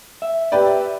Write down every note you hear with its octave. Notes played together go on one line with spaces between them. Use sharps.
E5
G4 B4 D5